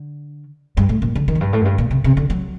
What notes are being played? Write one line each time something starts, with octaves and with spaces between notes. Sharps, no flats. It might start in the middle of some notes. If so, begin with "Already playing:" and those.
Already playing: D3
G2
A2
A#2
D3
D#3
F#2
G2
A2
F#2
G2
A#2
C3
C3
D3
F#3